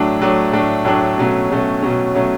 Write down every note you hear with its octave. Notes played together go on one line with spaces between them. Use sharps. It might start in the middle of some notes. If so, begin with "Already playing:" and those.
Already playing: A2 F#3 A3 D4
A2 F#3 A3 D4
A2 F#3 A3 D4
A2 F#3 A3 D4
B2 F#3 A3 C#4
B2 F#3 A3 C#4
B2 F#3 A3 C#4
B2 F#3 A3 C#4